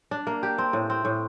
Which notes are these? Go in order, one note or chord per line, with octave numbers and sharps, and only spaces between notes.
D4
A#3
G4
C4
A2
C4
A2